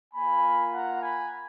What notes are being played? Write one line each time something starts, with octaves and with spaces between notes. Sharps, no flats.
A#3 F4 G#5 B5
F#5 A#5
G#5 B5